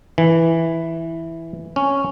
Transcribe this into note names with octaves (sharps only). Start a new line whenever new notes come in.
E3
C#4